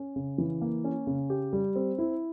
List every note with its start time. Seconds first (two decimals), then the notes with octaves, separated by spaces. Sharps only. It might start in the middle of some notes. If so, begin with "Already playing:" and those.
Already playing: C#4
0.16 C#3
0.38 E3
0.61 A#3
0.84 C#4
1.07 C#3
1.30 G4
1.53 G3
1.76 C4
1.98 E4